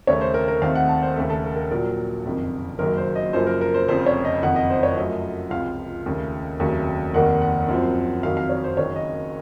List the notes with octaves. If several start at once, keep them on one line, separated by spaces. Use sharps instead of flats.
D#2 C#3 A3 C#5
C5
A#4
A#4
D#2 D#3 A3 C4 F5
F#5
A5
C5
D#2 C#3 A3 A4
A4
A#4
A#4
A#1 A#2 F#3 A#4
F#1 F2 C3 D#3
F#1 F#2 D#3 F#3 A#3 A#4
C5
D#5
F#2 C#3 F3 A#3 C5
A#4
A#4
C5
F1 F2 C#3 C5
C#5
D#5
F#1 F2 D#3 F#5
D#5
C5
C#5
F#2 F3 A3 D#5
C#2 C3 F3 F5
D#2 C#3 A3
F1 D#2 C#3 F#3 A3
F1 D#2 D#3 A#3 F#5
F#5
F#2 F3 C4
F2 D#3 F#3 F5
F5
C#5
C5
F#1 F#2 D#3 C#5
D#5